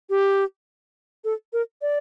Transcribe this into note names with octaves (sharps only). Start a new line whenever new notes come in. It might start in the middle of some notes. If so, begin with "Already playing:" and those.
G4
A4
A#4
D5